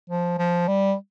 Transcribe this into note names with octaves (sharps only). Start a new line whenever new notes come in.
F3
F3
G3